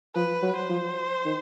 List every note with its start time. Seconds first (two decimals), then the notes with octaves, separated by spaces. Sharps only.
0.15 F3 B4
0.42 F#3
0.56 C5
0.69 F3
1.25 D#3